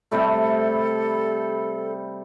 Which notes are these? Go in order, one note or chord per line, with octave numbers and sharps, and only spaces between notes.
C3 G3 A3 A4